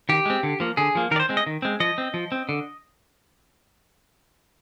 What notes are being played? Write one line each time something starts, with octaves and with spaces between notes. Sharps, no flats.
D#3 G4
G#3 C4
D3
F3 A#3
D3 G#4
F3 A#3
D#3 A#4 D5
C5
G#3 C4
D#5
D#3
G#3 C4
F3 D#5
C4
F3
C4
D3